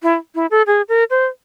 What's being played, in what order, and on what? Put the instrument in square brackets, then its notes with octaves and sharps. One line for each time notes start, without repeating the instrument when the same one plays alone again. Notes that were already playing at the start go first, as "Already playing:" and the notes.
[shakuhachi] E4
E4
A4
G#4
A#4
C5